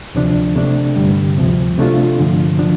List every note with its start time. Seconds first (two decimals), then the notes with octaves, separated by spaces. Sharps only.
0.15 D2 C3 F3 D4
0.55 C3 A3 D4
0.96 G2 D3 G3
1.37 D2 C3 F3
1.77 C3 A3 D4 F4
2.18 G2 D3 F3
2.59 D3 F3 D4